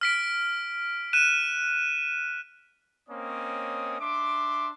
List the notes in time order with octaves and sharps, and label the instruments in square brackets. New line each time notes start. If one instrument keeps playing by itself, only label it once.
[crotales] F6 B6 D7
F#6 D#7 E7
[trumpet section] A#3 C4 C#4 C#5 D#5 D#6
D4 E5 C6 D6